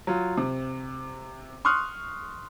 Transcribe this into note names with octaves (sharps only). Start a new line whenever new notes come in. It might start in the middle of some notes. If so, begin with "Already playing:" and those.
F#3 F4
C3
C6 C#6 D#6 F6 F#6